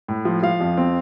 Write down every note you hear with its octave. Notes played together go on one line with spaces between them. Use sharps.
A2
F3
F3 F5
F2
C4